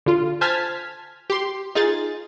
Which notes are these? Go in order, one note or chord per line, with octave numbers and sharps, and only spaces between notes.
D3 F4
C5 G#5 A5 F6 G#6 B6
G4 C6
D#4 F4 G#4 A6